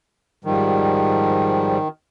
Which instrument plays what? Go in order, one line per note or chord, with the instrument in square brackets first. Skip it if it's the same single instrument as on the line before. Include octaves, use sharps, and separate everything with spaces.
[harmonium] G#2 F3 G3 [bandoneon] D#3